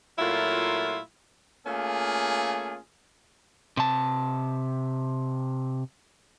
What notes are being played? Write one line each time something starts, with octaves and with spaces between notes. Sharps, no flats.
A#2 F#3 A3 E4 F4
A3 A#3 C#4 F4 G#4
C3 A5